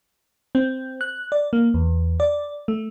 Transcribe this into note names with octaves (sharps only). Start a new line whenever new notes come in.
C4
F#6
D5
A#3
E2
D5
A3